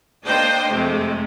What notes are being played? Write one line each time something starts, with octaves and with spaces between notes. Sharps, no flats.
A#3 D4 C5 D#5 G5
F2 C3 G#3 A3